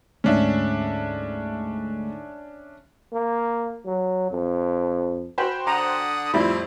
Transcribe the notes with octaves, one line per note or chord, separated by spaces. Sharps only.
D2 G#2 C#4 D4 E5
A#3
F#3
F2
F#4 C5 G5 B5
D3 F#5 A#5 D#6
F2 A2 G3 C4 E4 B5